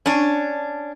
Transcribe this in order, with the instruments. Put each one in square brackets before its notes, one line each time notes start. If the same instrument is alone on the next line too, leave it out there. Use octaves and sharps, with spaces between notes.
[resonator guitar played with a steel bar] C#4 D4